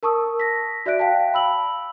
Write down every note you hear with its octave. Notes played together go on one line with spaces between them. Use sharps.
A#4 A5 C#6 D#6 E6
A#6 B6
F#4 D5 E5 F#6 B6 D7
F5 G5 A5
B5 E6 F#7